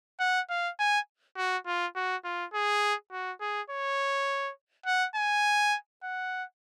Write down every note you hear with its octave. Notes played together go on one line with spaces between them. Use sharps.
F#5
F5
G#5
F#4
F4
F#4
F4
G#4
F#4
G#4
C#5
F#5
G#5
F#5